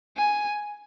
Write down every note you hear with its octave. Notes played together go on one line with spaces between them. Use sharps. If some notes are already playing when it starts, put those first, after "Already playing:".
G#5